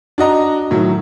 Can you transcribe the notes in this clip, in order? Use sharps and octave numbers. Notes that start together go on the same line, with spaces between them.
D4 F#4 D#5 A#5
A2 D#3 F#3